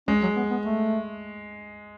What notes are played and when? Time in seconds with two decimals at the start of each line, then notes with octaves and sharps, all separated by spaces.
0.08 G#3 C#4
0.22 F#3
0.36 B3
0.50 B3
0.64 A3